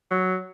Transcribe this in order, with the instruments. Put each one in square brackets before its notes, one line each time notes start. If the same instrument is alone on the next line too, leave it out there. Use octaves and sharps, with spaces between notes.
[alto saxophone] F#3